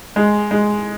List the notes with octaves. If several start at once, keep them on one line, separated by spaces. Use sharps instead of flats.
G#3
G#3